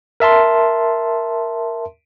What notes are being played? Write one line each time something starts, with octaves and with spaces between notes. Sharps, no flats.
A#4 E5 A5 C6